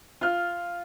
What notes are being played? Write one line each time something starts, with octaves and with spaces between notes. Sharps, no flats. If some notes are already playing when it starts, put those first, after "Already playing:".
F4 F6